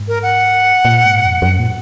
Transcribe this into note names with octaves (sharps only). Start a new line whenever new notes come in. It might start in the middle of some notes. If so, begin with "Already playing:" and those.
Already playing: G#2
A#4
F#5
A#2
G#2
F2
F2
F#2
A#2